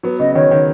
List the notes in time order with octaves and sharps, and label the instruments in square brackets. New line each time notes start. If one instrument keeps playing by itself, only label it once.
[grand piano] F#3 B3
[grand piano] C#3 F#3 [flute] D#5
[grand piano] D#3 [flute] C#5
[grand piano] D#3